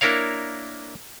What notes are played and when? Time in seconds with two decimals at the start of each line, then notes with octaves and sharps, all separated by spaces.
0.01 A#3 D4 E4 A#4 C#5 F5